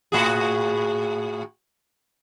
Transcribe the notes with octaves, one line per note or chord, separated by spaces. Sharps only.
A2 F#4 G#4